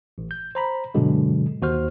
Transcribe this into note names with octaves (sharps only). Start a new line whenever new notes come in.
A1
G6
C5 A#5 B5
G2 B2 D3 F#3 G#3
D#2 F#4 C5 F6